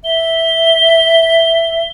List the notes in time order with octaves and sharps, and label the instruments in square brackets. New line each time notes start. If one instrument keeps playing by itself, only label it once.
[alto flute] E5 [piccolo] G7